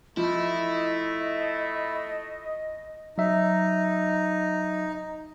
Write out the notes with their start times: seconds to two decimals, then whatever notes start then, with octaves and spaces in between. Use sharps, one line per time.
0.17 F3 A3 E4 D#5
3.18 F#3 D#4 E5